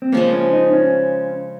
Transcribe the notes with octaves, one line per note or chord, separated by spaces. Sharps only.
C4
C#3 F3 G#3 A#3
C#4
D#4
C#4